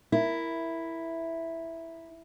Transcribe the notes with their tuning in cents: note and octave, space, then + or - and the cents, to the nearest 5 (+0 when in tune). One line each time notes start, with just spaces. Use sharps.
E4 +0 A#4 +0